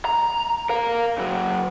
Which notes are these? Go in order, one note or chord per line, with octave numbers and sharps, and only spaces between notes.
A#5
A#4 F5
C#3 F#3